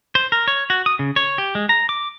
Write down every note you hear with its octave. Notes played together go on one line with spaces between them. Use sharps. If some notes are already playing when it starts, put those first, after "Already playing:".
C5
A#4
C#5
F#4
D#6
C#3
C#5
G4
G#3
A#5
D6